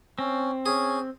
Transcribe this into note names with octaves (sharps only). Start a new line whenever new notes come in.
C4 C#4
C#4 G#4